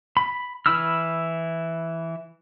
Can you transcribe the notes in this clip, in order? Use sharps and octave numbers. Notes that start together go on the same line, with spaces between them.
B5
E3 E4 B5 E6 F6